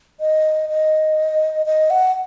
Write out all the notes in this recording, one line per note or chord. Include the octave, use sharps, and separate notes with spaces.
D#5
D#5
D#5
F#5